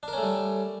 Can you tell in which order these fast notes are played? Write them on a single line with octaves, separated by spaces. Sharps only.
D4 A#4 C#4 A3 G3